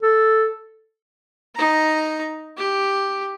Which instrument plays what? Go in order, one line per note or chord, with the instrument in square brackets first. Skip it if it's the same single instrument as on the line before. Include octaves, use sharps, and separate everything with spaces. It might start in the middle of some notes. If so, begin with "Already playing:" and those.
[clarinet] A4
[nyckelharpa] D#4 A#5
G4